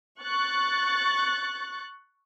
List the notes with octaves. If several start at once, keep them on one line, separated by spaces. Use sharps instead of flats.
C#6 F#6 A6